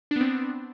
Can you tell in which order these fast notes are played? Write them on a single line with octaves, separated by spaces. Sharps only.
D4 B3 C4